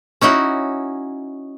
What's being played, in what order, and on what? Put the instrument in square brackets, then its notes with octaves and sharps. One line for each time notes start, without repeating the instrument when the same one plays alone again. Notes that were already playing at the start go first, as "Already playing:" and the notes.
[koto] C#4 D#4 E4 F#4